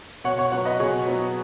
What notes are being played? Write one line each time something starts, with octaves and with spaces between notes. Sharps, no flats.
B2 C#5 F#5
C#5 F#5
F#3 B3 C#5 F#5
B4 D#5
B2 G#4 C#5
F#3 B3